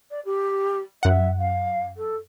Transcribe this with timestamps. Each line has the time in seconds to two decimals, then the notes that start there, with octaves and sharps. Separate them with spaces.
0.11 D5
0.25 G4
1.03 F#2 E5 F#5
1.39 F5
1.97 A4